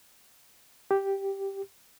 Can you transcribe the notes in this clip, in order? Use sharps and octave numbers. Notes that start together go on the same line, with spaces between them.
G4